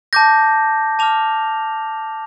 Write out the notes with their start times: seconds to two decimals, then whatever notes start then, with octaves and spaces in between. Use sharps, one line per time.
0.13 A5 D6 G6 A#6
0.99 A5 D6 F6 F7